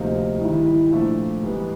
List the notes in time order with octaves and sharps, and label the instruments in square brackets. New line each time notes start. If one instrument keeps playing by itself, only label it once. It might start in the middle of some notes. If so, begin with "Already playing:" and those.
Already playing: [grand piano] D2 C3 F3 A#3 D#4
[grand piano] G#2 D#3 G3 [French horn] E4
[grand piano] A#2 F3 A3 D4
G#2 E3 G3 B3